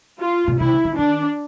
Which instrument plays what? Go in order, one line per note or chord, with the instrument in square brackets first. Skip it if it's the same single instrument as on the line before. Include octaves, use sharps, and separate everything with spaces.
[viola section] F4
[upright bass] B2
[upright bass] C3 [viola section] E4
[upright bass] C#3
D3
[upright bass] D#3 [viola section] D4